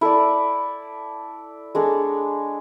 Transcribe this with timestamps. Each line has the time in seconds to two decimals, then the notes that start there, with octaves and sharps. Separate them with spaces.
0.01 E4 A4 D5
1.75 G#3 D4 A4 C#5